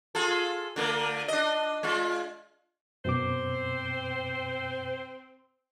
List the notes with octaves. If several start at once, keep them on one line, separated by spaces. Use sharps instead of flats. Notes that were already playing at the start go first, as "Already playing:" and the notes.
F4 G#4 A4
D3 A3 A#3
D4 D#5
G#3 F4
F#2 B2 C4 C5 D6